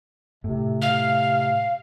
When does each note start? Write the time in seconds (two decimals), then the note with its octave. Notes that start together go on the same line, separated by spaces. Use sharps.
0.44 A2 C3
0.82 C3 F5